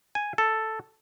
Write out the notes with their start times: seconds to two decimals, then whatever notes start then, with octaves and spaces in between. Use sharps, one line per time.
0.15 G#5
0.38 A4